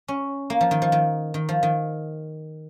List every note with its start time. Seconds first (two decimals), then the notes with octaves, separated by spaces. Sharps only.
0.08 C#4
0.50 A#3
0.61 F3
0.71 D#3
0.82 F3
0.92 D#3
1.34 D#3
1.49 F3
1.63 D#3